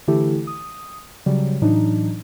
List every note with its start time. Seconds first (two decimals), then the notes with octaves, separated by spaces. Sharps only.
0.08 D3 E3 A3 E4 G4 A4
0.47 D#6
1.26 C#3 F#3 G3
1.61 A2 E3 F#3 D4 D#4